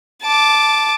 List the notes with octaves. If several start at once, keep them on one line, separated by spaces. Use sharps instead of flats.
A5 D6